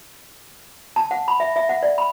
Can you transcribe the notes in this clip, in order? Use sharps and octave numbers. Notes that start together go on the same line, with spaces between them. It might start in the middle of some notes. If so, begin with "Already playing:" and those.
A5
F#5
B5
E5
E5
F#5
D5
B5